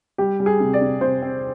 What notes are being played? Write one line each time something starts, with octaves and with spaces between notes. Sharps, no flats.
G3 G4
G3
G#4
C3
D5
C3
C3 C5
C4